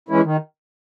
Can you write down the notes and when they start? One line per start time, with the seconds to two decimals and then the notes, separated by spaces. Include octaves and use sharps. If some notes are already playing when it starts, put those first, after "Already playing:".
0.09 E3 G#3 C#4 E4
0.24 D#3